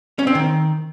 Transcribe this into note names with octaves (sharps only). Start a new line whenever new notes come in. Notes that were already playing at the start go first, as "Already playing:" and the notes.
C#4
C4
D#3